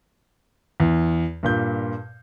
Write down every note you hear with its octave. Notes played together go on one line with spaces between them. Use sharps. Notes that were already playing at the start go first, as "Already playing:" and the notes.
E2
G2 A#2 G6